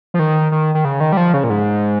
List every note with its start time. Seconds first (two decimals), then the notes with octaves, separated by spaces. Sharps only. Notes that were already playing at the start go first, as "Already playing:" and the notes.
0.14 F3
0.19 D#3
0.52 D#3
0.75 D#3
0.85 C#3
1.00 D#3
1.12 G3
1.17 F3
1.34 C#3
1.44 A#2
1.50 G#2